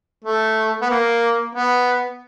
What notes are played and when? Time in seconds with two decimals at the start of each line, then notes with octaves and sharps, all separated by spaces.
0.24 A3
0.81 B3
0.90 A#3
1.55 B3